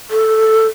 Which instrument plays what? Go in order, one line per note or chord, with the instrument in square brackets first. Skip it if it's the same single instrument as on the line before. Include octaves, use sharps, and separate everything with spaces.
[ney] A4